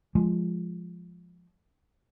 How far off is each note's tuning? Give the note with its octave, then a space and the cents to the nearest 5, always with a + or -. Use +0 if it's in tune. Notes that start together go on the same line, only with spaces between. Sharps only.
F3 +0 G#3 +0